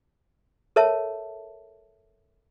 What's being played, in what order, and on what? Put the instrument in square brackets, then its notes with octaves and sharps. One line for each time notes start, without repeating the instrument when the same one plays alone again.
[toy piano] A4 A#4 C#5 E5 A5